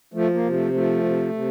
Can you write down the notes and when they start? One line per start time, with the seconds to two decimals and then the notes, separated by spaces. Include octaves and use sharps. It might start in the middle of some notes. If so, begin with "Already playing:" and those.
0.14 F3 A3
0.34 A#3
0.44 C3
0.53 A3
0.73 F3 A3
1.04 C3
1.33 C3